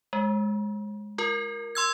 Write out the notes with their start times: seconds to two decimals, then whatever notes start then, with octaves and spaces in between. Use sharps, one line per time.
0.13 G#3
1.18 F4 A#4
1.75 C6 E6 G#6